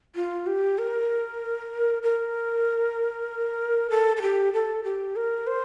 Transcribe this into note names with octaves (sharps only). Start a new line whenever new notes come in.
F4
G4
A#4
A#4
A4
A4
G4
A4
G4
A#4
C5